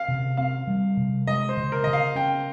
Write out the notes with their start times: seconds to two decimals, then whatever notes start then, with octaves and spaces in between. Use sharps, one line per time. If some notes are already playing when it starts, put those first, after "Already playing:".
Already playing: F5
0.08 C3
0.37 C4 F5
0.67 G3
0.97 C3
1.27 G#3 D#5
1.49 C5
1.57 C#3
1.72 A#4
1.84 C#3 D#5
1.93 F5
2.15 C#4 G5